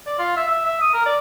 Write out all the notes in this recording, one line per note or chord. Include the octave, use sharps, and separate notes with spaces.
D5
F4
E5
E5
E5
D#6
A#4
D5